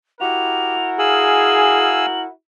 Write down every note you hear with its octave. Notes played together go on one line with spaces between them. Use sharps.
E4 F#4 G4 A#4 F7
G#4 F5 G#5 E6 F#7